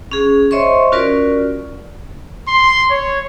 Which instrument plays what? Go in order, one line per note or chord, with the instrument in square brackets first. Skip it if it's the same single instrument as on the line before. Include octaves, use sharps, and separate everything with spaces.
[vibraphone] C#4 G#4
C5 C#5 D#5 E5 C6 C#6
C#4 F4 F#4 A#4 B4 D5
[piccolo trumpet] C6
C#5